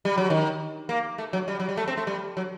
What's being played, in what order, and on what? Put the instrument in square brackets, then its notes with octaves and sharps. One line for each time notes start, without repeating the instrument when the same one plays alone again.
[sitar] G3
F#3
D#3
A#3
A3
F#3
G3
F#3
G3
A3
C4
A3
G3
F#3